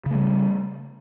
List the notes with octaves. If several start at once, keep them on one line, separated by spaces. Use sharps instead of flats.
C#3 G3 A3